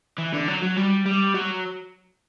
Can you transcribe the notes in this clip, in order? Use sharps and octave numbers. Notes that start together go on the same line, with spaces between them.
E3
D3
F#3
F#3
G3
G3
F#3